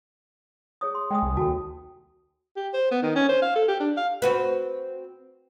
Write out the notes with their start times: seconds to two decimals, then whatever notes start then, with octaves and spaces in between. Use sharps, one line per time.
0.81 G#4 C#5 D#6
0.95 C6
1.11 G#3 G5 G#5 D#6
1.23 C2
1.37 D#2 F#4 A4 G5 A5
2.56 G4
2.74 C5
2.91 B3
3.03 D#3
3.16 C#4
3.29 C5
3.42 F5
3.56 A4
3.68 G4
3.80 D4
3.97 F5
4.22 C4 F#4 B4